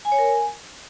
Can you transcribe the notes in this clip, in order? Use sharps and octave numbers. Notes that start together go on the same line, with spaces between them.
G#5
C#5
A#4
G#5